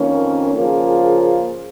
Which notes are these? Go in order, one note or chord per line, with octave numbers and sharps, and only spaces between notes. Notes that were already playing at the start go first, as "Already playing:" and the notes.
Already playing: F2 D#3 A#3 C#4
C#3 F3 A#3 F4 G#4